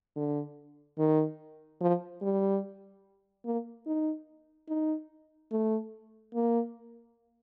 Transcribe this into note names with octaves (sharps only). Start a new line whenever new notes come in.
D3
D#3
F3
G3
A#3
D#4
D#4
A3
A#3